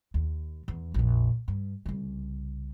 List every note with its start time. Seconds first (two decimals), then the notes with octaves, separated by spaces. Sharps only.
0.14 D#2
0.68 E2
0.94 A#1 F2
1.48 G2
1.86 C2 C#3